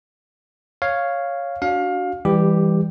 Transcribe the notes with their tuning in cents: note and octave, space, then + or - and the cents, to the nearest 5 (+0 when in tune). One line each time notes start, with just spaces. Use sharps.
C#5 +0 F5 +0
D4 -25 F#4 +0 F5 +25
E3 +0 G3 +25 G4 +0